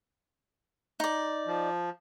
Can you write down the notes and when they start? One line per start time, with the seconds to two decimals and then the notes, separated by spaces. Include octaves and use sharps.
1.00 D#4 D5
1.47 F3